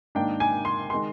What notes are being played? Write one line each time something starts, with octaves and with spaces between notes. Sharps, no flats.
G#2 D#3 A#3 D4 G5
G#5
C6
D#3 G#3 C6